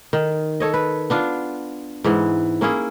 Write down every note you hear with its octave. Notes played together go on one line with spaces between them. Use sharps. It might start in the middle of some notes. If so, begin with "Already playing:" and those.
D#3
A4 C#5 D#5
B4
B3 D4 F4
G#2 E3 B3
A#3 C#4 E4 G#4